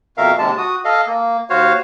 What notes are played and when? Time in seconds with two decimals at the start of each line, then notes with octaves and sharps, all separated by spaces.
0.17 F2 B2 A#4 E5 F5
0.38 D#2 C3 G#3 A5
0.58 F#4 D#6
0.85 A4 D#5 F5
1.07 A#3
1.50 D#2 F#4 C5 C#5 F5